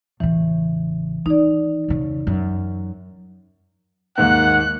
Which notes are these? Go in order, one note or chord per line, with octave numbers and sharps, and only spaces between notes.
A1 C#3 E3
D#3 D#4 D5
F2 C#3
F#2
D#2 G#2 A#3 F#5 F#6